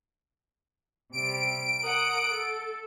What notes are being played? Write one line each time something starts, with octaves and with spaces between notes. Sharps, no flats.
C3 G3 D7
A#4 F#5 D#6
A4